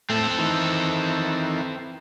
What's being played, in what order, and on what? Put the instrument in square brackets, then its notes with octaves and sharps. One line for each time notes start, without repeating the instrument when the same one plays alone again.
[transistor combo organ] A2 A3 [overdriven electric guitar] C4 A4
[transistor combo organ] D#3 E3